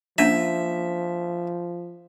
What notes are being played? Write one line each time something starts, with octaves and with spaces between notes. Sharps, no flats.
F3 A#3 C#4 D4 E5